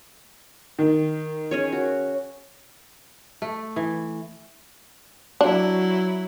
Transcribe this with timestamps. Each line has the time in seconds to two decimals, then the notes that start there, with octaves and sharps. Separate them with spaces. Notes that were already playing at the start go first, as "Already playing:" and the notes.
0.79 D#3
1.51 C#4 G#4 C#5
1.72 F#4
3.42 A3
3.76 E3
5.41 F#3 D4 E4